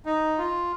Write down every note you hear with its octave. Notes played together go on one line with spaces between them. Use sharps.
D#4
F4